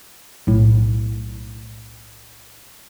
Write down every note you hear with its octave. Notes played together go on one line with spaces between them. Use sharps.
B1 A2